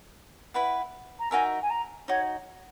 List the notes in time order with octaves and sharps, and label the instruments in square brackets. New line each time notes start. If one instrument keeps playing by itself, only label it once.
[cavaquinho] E4 B4 F#5
[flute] A#5
[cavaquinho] D#4 F#4 A#4 E5 [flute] G#5
[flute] G#5
A#5
[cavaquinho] D#4 F#4 [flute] C#5